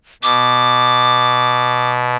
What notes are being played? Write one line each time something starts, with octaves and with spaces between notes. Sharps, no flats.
B2 D6